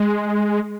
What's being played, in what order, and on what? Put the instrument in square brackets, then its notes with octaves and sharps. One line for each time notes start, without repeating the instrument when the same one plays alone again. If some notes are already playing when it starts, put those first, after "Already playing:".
Already playing: [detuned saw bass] G#3